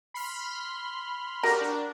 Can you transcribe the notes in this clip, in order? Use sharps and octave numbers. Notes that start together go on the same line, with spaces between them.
B5 C6 F6
F#4 G4 A#4 D5
D4